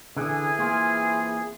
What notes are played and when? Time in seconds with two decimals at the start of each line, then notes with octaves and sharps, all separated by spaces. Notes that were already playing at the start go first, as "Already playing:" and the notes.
0.17 D3 E3 G#4
0.59 A#3 C4 F4